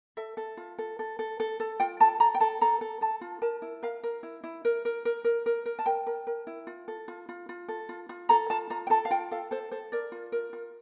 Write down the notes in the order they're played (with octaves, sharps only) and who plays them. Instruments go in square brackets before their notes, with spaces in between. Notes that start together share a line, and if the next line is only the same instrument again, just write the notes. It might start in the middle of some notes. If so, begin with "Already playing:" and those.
[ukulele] A4 E5
A4
F4
A4
A4
A4
A4
A4
F4 G5
A4 A5
A4 A#5
G5
A4 A5
A4 A#5
A4
A4 A5
F4
A#4 A5
E4
A#4 F5
A#4
E4
E4
A#4
A#4
A#4
A#4
A#4
A#4
A5
A#4 G5
A#4
A#4
E4
F4
A4
F4
F4
F4
A4
F4
F4
A4 A#5
F4 A5
F4 A#5
G5
A4 A5
F5
F4 G5
A4 F5
A4 C5
A4 C5
A#4 D5
F4
A#4
F4